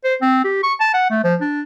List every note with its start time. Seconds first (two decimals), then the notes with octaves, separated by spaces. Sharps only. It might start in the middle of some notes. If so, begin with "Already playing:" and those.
0.04 C5
0.21 C4
0.44 G4
0.63 C#6
0.80 A5
0.94 F#5
1.10 A3
1.24 F3
1.41 D4